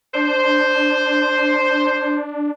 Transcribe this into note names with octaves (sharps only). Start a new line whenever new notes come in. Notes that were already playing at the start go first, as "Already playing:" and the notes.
D4 C5